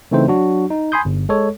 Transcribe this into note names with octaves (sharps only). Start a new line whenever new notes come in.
C#3 E3 A3 C4 D#4 C5
F#3 D4 F#4
D#4
G#5 B5 C6 D#6 G6
G1
G#3 A4 C#5